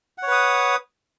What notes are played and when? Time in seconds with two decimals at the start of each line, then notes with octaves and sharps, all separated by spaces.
0.18 F#5
0.23 C#5
0.27 B4
0.32 D#6